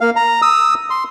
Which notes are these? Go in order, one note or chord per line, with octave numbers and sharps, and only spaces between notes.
A#3 F5
A#5
D#6 E6
C6